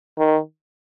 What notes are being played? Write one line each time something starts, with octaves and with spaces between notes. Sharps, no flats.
D#3